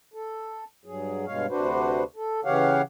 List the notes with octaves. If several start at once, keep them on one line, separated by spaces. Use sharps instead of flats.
A4
G2 F#3 G#4
G2 B2 G#3 C#5 F5
D2 C3 D4 F#4 B4 C5
A4
C#3 E3 G4 C#5 F5 F#5